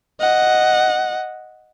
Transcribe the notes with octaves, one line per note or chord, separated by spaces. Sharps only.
D#5 F#5